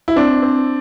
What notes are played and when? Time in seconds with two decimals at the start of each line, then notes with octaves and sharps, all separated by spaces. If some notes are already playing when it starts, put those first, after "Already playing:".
0.08 E4
0.16 C4 D4
0.42 C4